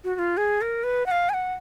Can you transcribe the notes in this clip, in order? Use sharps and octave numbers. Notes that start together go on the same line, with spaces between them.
F#4
F#4
F4
G#4
A#4
B4
F#5
F5
G#5
F#5